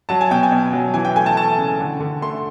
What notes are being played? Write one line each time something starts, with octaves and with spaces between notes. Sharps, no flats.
F#3 A5
G#5
B2 G5
G#5
B2
F#3
E3 G#5
G5
A3 G#5
A5
A3 A5
C#3
D3
D3
A3 C6